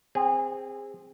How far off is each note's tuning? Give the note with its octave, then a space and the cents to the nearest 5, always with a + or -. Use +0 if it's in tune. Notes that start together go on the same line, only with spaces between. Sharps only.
C4 +0 G#4 -25